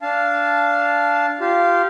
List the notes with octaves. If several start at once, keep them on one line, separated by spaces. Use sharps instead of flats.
D4 F5 A5
F4 G4 F5